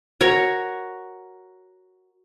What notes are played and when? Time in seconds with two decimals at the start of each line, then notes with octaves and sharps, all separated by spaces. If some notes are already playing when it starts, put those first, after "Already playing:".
0.21 F#4 A#4 C#5